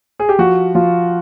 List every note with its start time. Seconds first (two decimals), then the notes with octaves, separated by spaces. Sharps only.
0.19 G#4
0.29 G4
0.39 F3 F#4
0.75 F3 F4